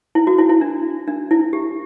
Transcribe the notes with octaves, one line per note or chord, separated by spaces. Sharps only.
E4
F#4
E4
E4
D4
D4
E4
G4